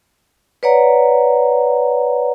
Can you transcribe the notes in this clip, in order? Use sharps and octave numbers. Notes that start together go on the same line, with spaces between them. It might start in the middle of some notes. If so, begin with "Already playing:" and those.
B4 C#5 D5 F#5 A#5